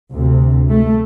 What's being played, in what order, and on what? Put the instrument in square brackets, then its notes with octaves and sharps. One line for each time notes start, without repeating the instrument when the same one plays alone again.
[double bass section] D2 C3
A3